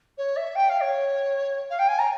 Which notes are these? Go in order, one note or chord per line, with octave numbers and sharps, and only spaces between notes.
C#5
E5
G5
F5
C#5
F5
G5
G#5
A#5